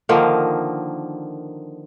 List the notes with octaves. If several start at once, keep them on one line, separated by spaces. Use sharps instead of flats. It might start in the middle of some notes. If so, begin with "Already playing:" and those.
D3 D#3 F3 A#3